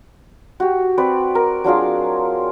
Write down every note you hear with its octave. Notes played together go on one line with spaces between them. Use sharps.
F#4 G4
C4 B4 D5
A#4
F#3 D4 F4 G#4